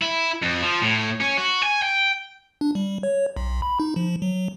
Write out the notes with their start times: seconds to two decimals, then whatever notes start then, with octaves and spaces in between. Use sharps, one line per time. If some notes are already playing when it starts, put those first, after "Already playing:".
0.02 E4
0.42 F2
0.62 F3
0.82 A2
1.20 C#4
1.37 F#4
1.63 G#5
1.82 G5
2.61 D4
2.75 G3
3.03 C#5
3.37 B1
3.62 B5
3.80 D#4
3.96 F3
4.22 F#3